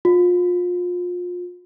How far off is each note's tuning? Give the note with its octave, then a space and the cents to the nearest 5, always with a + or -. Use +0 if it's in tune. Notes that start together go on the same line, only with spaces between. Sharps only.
F4 +30